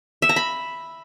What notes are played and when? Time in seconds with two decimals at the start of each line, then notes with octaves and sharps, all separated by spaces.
0.22 E5
0.29 A#5
0.36 B5